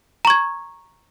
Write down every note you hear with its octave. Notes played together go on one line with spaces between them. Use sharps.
A#5 C#6 G#6